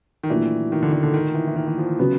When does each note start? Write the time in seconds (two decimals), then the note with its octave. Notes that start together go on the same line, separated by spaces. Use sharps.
0.23 D#3
0.29 A#2 E3 F#3 A3 D4 F#4
0.72 D#3
0.83 D3
0.93 D3
1.03 D3
1.14 D#3
1.35 E3
1.47 E3
1.56 D#3
1.67 E3
1.78 F3
1.99 C#3 F#3 B3